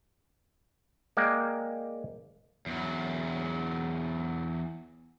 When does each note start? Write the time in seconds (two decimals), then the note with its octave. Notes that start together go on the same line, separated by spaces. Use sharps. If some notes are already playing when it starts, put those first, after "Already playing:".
1.17 G#3 A#3 D5 G5
2.66 E2 F#3